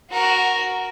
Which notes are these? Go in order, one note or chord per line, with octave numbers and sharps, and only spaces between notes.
F#4 A#4